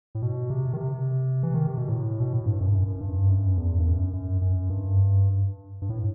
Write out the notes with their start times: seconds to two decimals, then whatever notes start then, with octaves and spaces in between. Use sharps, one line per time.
0.15 A2
0.22 B2
0.50 C3
0.73 D#3
0.77 C3
1.43 E3
1.54 D#3
1.67 C3
1.78 B2
1.89 A2
2.20 B2
2.33 A2
2.46 G2
2.60 F#2
2.73 F#2
2.88 F#2
3.01 G2
3.29 F#2
3.57 E2
3.78 G2
3.86 F#2
4.13 F#2
4.41 F#2
4.70 G2
5.82 G2
5.89 A2